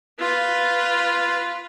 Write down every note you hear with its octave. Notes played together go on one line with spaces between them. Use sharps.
F4 B4